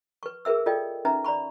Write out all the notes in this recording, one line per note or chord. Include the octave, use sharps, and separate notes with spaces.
B4 C#6
G#4 A#4 B4 E5 E6
F4 A4 D5 D#5 G5
C#4 D#4 B4 E5 A#5
D5 A#5 B5 C#6